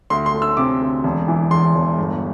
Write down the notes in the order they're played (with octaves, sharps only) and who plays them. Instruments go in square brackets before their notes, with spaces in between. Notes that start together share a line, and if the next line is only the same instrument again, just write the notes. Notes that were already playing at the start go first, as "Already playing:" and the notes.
[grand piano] D2 C6
C6
A3
E6
C3 D6
D2
E1
E3
E2 C6
E1
G1